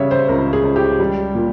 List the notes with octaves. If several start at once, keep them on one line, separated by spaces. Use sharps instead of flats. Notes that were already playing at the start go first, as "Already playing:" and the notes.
Already playing: C#3 G3 C#5 E5
C5
C#2 A#4
G#4
C#2
G4
G3
A#2